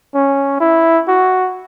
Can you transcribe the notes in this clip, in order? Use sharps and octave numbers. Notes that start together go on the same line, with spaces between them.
C#4
E4
F#4